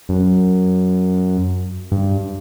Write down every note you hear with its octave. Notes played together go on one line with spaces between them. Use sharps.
F#2
G2